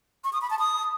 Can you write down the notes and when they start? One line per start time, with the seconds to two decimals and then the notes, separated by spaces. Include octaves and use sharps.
0.24 C#6
0.33 D#6
0.42 B5
0.50 A5
0.59 D#6